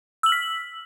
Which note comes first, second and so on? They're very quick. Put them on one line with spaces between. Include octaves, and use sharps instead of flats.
E6 F#7 F6 B6